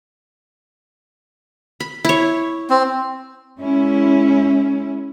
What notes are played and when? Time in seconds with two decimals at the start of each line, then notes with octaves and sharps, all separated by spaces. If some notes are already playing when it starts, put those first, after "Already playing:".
1.80 B5
2.05 E4 C#5
2.70 C4
3.59 G#3 C#4 E4